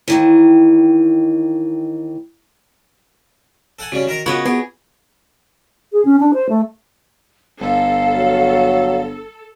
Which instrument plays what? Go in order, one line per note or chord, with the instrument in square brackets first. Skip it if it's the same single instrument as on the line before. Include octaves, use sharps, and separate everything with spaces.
[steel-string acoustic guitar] D#2 D#3 E3
[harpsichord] A4 F#5 G#5
[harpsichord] C#3 G3 C#4 [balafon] F#4
[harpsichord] D#3 A#4 A#5
[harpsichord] C#3 [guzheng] B3 C#5 D#5 [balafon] F4 F#4 F#5
[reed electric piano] B3 [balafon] F4 [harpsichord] G4 [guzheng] G#4
[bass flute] G#4
C#4
D4
C5
A3
[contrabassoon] G1 [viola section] A4 [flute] F5
[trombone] F#3